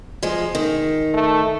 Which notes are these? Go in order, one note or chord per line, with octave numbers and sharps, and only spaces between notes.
F3 G#3
D#3
A3